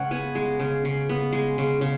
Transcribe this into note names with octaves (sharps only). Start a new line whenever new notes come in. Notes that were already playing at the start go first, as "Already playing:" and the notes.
Already playing: C#3 G#3 B4 C#5 F#5
B3 G#5
G#3
C#3
C#3
B3
G#3
C#3
C#3